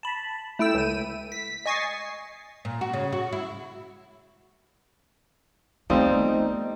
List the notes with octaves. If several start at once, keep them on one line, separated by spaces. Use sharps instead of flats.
A5 B5
A3 E4 G5 E6 E7
C#2 D#7
B6
D#5 G#5 C#6 A6 C7
A#2
F#4
C#3
F#4
E4
F3 G3 A3 B3 C4 D#4